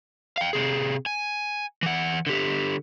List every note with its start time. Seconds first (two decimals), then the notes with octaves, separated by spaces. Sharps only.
0.38 F5 G5
0.53 C3 G#4
1.06 G#5
1.83 E3 F#5
2.27 D3 G4